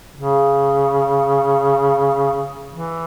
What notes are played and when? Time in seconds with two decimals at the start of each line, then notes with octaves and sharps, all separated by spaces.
0.16 C#3
2.71 E3